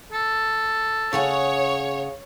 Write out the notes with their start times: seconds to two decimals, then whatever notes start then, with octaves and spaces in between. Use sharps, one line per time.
0.12 A4
1.13 C#3 G#4 C#5 F#5